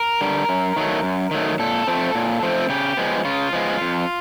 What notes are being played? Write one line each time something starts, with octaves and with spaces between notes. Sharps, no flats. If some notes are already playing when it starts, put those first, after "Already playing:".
Already playing: A#4
D3 G3
F#2
D#3 F#3 A3
F#2
D#3 F#3 A3
A#2 A4
F3 A3 C4
A#2
F3 A3 C4
C#3 G4
F3 G#3 B3
C#3 F4
F3 G#3 B3
F2